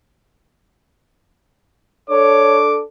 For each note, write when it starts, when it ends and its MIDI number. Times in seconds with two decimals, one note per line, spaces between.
2.10 2.81 62
2.10 2.81 69
2.10 2.58 73
2.10 2.79 86